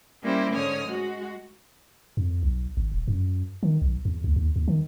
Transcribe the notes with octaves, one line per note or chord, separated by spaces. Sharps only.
G3 A#3 C#4 E4 G4 C5
G#2 D3 C#5 D#6 F6
G#3 F#4
F2
B1
G#1
D#1
F#2
D#3
B1
E2
D2
D#2
D#2
D#3